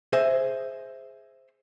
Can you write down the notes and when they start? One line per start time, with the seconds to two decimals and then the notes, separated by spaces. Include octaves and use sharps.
0.13 G#4 C5 D#5 E5